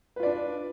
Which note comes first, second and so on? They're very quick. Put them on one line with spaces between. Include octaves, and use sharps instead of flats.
B4 F4 D5 D4